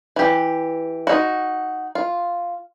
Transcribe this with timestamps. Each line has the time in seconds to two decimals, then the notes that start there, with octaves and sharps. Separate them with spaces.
0.16 E3 G4
1.07 D#4 F#4
1.95 F4